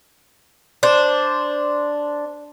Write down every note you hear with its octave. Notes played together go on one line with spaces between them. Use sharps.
D4 C5